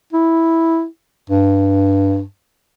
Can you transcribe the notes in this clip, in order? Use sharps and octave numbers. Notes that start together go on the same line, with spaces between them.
E4
G2